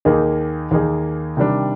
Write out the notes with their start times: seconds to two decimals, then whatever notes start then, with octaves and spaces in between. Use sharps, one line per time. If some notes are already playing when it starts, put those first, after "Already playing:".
0.05 D#2 D#3 A#3 D#4 G#4
0.71 D#2 D#3 A#3 D#4 G#4
1.37 C3 D#3 G3 D4